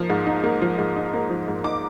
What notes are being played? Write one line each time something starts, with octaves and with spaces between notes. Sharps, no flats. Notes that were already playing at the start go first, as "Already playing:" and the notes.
Already playing: F3 A#3 D#4
G#2
D#4
A#3
F3
G#2
D#4
A#3
F3
G#2
D#4 D6